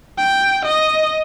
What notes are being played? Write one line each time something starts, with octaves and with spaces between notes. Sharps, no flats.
G5
D#5